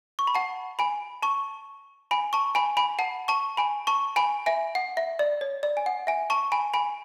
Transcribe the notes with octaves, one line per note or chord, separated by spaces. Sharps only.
C#6
B5
F#5 A5
G#5 B5
A5 C#6
G#5 B5
A5 C#6
G#5 B5
G#5 B5
F#5 A5
A5 C#6
G#5 B5
A5 C#6
G#5 B5
E5 G#5
F#5
E5
D5
C#5
D5
G#5
F#5
E5 G#5
A5 C#6
G#5 B5
G#5 B5